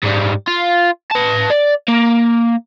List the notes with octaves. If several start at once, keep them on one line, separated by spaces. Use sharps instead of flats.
G#2 G3
F4
B4 A5
D5
A#3